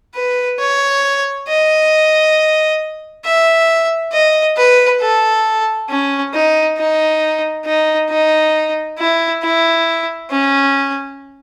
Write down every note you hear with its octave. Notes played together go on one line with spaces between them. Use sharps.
B4
C#5
D#5
E5
D#5
B4
A4
C#4
D#4
D#4
D#4
D#4
E4
E4
C#4